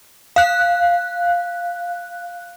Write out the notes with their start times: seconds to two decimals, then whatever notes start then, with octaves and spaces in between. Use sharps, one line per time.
0.36 F5 F#6